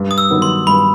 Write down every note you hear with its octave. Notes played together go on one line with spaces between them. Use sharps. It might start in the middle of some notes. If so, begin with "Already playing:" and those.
Already playing: G2
D#6
E6
D#3 F#3 B3 D#4
C6
G2 B5